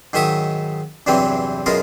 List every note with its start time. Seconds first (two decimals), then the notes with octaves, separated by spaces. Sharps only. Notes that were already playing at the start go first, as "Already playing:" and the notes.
0.13 G#2 D#3 F#3 E5 C#6 D#6
1.06 E2 G2 C3 E3 F#3 C4
1.66 F#2 B2 G#3 F4 A#4